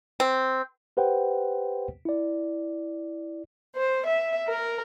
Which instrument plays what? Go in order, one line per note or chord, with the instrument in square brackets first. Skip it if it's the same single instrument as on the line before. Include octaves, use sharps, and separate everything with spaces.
[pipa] C4
[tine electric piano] G4 B4 C5 F#5 G5
E4 D5
[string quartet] C5
E5
A#4